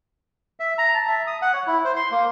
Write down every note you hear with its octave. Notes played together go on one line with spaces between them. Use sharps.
E5
A#5
A5
E5
D#6
F#5
C#5
E4
C5
C6
A#3